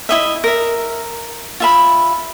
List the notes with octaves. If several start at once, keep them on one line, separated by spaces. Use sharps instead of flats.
E4 D#5 E5
A#4 E5
F4 E5 B5